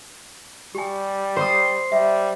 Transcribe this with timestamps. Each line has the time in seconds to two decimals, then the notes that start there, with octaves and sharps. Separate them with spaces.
0.75 G3 G4 G#5
1.36 C5 C6 D#6
1.92 G3 E5